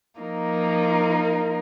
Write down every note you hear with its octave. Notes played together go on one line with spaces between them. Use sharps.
F3 A#3 D#4 A#4